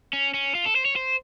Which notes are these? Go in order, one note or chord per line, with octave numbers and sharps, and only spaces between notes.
C#4
C#4
F4
A4
C5
C#5
C5